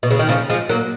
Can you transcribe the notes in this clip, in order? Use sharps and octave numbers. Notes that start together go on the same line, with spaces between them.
B2
C#3
D#3
C#3 F3
F3 G#3
F#3 A#3